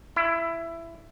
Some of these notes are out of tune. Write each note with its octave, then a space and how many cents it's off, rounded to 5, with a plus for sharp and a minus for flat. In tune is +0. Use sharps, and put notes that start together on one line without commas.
E4 +15